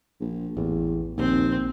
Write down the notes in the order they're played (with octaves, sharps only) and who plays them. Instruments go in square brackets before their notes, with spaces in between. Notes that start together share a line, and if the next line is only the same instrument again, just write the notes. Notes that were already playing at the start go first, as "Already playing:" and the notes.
[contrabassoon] A#1
[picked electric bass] A1 [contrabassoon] E2
[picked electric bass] A#1 [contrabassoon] D#2 [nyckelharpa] C4